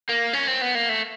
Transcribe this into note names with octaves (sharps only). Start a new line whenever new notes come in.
A#3
C#4
C4
B3
A#3
A3